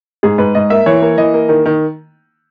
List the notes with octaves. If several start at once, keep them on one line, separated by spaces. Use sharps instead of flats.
G#2 G#4
G#2 B4
G#2 D#5
A#3 E5
E3 C#5
A#3
E3 D#5
A#3
D#3
D#3